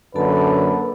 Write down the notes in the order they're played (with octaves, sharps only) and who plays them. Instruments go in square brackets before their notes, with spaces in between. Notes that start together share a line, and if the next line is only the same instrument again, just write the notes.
[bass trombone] F#2 [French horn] D3 [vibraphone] A#3 A4 A5 [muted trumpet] B4